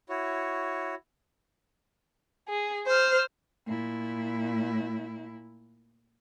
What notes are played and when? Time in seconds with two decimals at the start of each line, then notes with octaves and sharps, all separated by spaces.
0.09 E4 F#4 C#5
2.49 G#4
2.87 C5 F6
3.66 A#2 E4